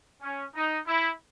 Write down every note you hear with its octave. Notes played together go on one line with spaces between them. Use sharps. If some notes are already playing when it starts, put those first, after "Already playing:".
C#4
D#4
E4